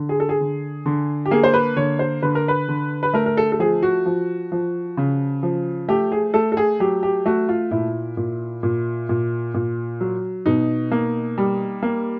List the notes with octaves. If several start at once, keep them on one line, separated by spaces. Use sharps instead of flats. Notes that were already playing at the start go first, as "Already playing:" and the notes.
Already playing: D3
G#4
A4
G#4
D3
D3
G4
A#3 G#4
C5
B4
D3 C#5
C5
D3 B4
A#4
B4
D3
B4
A3 A#4
A#4
A4
A4
F3 G#4
F#4
F3
F3
C#3
F3
A3 G4
G#4
A3 A4
A4
G#4
F#3 G4
G4
A3 F#4
F4
A#2 E4
A#2
A#2
A#2
A#2
F#3
B2 D#4
A#3
G3
A#3